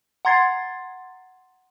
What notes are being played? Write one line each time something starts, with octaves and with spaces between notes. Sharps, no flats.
F#5 A#5 C6 G#6 A6 C7